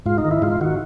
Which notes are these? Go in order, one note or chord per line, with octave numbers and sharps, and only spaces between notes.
G#2 F4
D#4
D#3
E4
G#2 F4
D#3 F#4